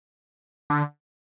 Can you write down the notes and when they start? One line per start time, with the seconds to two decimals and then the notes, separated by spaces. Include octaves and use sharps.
0.70 D3